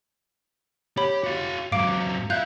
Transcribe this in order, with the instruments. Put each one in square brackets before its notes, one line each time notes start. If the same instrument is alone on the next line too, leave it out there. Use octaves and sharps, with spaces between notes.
[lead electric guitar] G4 [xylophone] C#5 B5
[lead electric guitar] F#4 F5
[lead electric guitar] G#2 F#3 [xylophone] F5 D6 D7
[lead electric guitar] F4 E5 [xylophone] F5 F#6 G6